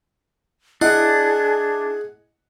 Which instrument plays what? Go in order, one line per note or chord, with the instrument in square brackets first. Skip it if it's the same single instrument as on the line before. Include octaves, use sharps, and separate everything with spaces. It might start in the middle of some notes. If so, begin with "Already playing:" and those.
[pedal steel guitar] D4 [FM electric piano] E4 [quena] G#4 [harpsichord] D#5 F#5